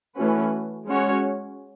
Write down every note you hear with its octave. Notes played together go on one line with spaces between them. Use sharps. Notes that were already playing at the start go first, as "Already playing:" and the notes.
E3 A3 C#4 F#4 B4
G#3 C#4 F#4 C#5